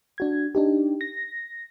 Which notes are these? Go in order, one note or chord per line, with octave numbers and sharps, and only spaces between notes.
D4 F#4 G#6
D4 D#4 G4
A#6